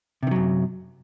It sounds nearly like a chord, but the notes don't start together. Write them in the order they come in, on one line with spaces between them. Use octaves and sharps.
C3 D#3 F#3 F#2